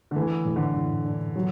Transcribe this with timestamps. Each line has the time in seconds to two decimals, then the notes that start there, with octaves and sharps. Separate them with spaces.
0.11 D3
0.15 E3 A3
0.45 A2
0.56 D3
0.75 A2
1.05 D4
1.36 F#3